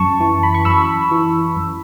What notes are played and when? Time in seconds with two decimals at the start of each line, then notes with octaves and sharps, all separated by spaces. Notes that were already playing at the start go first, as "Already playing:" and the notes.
Already playing: F#2 A5 C#6
0.20 E3
0.43 B5
0.54 C#6
0.65 F#2 B5 E6
1.11 E3
1.56 F#2